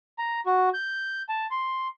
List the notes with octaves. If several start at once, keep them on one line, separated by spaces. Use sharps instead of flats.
A#5
F#4
G6
A5
C6